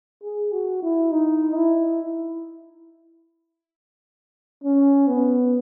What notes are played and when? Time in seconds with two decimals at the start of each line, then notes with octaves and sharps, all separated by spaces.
0.24 G#4
0.53 F#4
0.83 E4
1.12 D#4
1.55 E4
4.64 C#4
5.08 B3